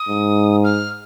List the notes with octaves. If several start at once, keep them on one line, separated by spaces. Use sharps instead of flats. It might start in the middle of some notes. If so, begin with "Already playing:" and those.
Already playing: D#6
G#2
F6